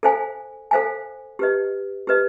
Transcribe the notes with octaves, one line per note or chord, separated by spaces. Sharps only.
A4 C5 F5 G#5
A4 C5 F5 G#5
G4 B4 D#5
G4 B4 D#5